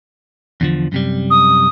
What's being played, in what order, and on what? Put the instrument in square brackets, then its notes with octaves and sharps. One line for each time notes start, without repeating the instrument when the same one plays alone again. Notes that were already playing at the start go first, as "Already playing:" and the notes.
[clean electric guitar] E2 D3 F3
F#2 C3 G3
[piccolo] D#6